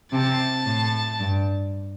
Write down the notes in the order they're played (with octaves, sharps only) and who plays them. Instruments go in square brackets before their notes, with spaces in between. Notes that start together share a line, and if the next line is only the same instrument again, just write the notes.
[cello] C3 [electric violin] A5
[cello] A2
G2